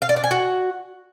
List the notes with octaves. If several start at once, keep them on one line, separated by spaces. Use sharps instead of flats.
F5
D5
D4
G#5
F#4